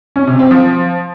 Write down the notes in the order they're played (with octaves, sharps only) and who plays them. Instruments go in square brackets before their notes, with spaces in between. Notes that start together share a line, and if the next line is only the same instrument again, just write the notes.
[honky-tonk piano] C#4
C3
C4
F3